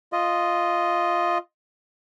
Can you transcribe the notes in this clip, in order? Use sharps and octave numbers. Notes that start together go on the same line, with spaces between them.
F4 D#5